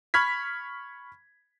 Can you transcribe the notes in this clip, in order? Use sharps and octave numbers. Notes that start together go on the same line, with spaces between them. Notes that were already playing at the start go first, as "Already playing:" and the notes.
B5 C#6 F6 G#6 B6